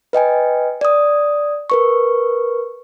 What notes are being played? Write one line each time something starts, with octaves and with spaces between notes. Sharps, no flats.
B4 D#5 G5 G#5
D5 D#6
A#4 B4 C#6